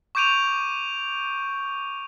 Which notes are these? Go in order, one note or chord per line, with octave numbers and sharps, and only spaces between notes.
C#6 D6 G6 D7 D#7 F7